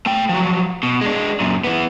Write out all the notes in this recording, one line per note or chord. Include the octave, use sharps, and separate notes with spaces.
A3 G5
F3 F#3
B2
G#3 D4
F#2 A#2
E3 B3